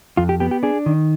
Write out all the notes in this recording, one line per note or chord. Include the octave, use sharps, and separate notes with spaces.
F2 F4
G4
B3 G4
G4
D4 G#4
D#3